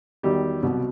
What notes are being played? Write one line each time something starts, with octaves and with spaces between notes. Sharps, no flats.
E2 D#3 F#3 G3 G4
C2 B2 F#3